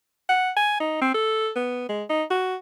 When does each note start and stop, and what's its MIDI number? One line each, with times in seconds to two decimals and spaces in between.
0.29 0.51 78
0.56 0.77 80
0.80 0.99 63
1.01 1.11 60
1.14 1.50 69
1.56 1.87 59
1.89 2.04 56
2.09 2.23 63
2.30 2.56 66